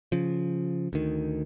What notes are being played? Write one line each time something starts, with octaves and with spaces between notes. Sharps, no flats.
C#3 F3
D2 D#3